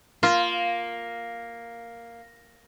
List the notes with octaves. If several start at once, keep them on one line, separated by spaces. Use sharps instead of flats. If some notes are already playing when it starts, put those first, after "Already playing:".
A#3 F4